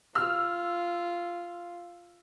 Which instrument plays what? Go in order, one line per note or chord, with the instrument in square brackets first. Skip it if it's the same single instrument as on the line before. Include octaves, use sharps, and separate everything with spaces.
[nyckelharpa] F4 [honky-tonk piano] E6 F6